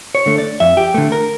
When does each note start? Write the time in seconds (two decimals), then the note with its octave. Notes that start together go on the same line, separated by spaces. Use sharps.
0.15 C#5
0.26 D3 A3
0.38 D5
0.60 F2 E5
0.77 G4
0.94 D3 A3
1.12 A#4